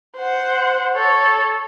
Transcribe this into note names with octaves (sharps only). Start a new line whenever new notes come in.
C5 F#5
A4 C#5